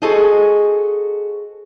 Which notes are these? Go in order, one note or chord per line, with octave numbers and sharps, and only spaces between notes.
F#4 G#4 A4 C5 D#5